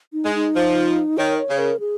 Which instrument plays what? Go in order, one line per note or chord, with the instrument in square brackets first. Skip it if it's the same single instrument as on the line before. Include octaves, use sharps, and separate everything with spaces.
[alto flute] D#4
[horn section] G#3
[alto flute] D#4
[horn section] F3
[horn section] D#3 [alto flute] C#5
[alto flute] C#5
[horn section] C#3
[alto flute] A#4
G#4